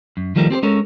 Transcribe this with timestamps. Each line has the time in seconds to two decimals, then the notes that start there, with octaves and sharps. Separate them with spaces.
0.17 F#2
0.36 D#3 F3 G3 A3 A#4
0.51 C4 G4 G#4 C5
0.63 G#3 C#4 A4 A#4 C#5